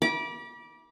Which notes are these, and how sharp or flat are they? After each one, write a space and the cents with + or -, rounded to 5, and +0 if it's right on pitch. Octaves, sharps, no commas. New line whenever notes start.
B5 -40 D6 -5